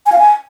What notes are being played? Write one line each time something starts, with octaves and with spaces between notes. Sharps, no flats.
G#5
F5
G#5